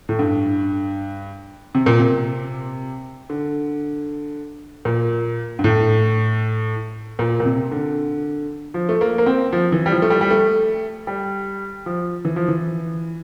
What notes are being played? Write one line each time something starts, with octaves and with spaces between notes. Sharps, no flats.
A2
G2
C3
A#2
C3
D3
A#2
G2
A2
A#2
A#2
C3
D3
F3
A3
A#3
A#3
C4
F3
E3
G3
F3
A3
G3
G3
A3
G3
F3
E3
F3
E3